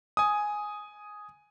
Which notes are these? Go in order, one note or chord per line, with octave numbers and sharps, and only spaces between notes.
G#5 D#6